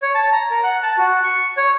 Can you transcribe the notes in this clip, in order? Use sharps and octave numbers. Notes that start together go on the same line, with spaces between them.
C#5
A5
A#5
A#4
F#5
A5
F#4
C#6
C#5